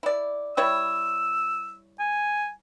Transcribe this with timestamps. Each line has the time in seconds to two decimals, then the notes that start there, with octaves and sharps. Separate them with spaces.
0.03 E4 D5
0.57 G3 E4 C#5 E6
1.99 G#5